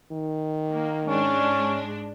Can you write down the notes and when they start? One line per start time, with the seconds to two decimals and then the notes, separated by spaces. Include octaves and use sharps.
0.12 D#3
0.71 A#3
1.08 G#2 G#3 C#4 D4